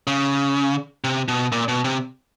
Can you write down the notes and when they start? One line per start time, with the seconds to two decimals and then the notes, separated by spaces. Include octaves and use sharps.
0.07 C#3
1.04 C3
1.28 B2
1.52 A#2
1.68 B2
1.84 C3